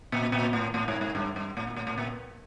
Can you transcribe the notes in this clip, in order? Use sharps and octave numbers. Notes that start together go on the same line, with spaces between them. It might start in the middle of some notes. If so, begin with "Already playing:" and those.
A#2
A#2
A2
A2
G#2
G#2
G2
G2
A2
A#2
A2
A2
A#2